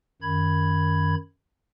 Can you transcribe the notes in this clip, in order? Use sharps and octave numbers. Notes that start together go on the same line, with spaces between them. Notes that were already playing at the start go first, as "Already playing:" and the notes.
F#2 D#3 B5 G#6